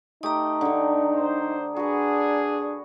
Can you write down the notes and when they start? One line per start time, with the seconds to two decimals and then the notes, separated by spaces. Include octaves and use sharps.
0.23 A3 D#4 G4 G5 A#5 D#6
0.61 D3 A3
1.14 C5
1.76 D4 F#4 G#4 B4